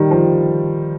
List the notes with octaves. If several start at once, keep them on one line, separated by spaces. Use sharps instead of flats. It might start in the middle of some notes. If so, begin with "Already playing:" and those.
Already playing: D#3 G3
F3